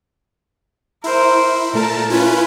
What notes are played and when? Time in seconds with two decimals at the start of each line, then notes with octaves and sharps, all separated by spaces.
1.04 E4 A#4 C5
1.73 A#2 A3 A#4 A5
2.10 C#4 E4 F4 B4